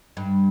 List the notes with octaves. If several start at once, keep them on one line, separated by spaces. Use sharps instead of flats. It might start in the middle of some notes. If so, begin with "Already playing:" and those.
G2